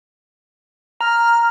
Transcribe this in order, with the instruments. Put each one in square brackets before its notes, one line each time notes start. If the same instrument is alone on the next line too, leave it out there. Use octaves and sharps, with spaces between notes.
[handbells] A#5 [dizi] F6